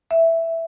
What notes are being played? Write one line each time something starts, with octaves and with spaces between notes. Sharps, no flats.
E5